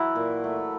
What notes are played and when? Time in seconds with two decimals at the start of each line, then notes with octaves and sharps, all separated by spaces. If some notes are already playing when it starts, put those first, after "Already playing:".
Already playing: E3 F#3 E4
0.15 A#2
0.44 A3